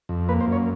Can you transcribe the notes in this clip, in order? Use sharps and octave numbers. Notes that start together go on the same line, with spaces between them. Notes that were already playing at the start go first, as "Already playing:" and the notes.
F2
A#3 B4
C5
F#2
C#5